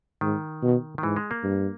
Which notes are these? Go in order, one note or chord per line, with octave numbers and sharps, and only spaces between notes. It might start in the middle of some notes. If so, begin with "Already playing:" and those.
G#2 D#3
B2
D#3
G#2 E3
G#3
A#3
G2